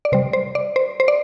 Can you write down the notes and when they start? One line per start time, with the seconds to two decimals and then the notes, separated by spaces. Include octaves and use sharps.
0.05 D5
0.12 C3 G3 C5
0.33 C5
0.55 D5
0.76 C5
1.00 C5
1.08 D5